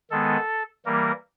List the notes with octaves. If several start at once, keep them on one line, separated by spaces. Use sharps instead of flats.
D#3 G#3 B3 A4
E3 G3 A#3 A#4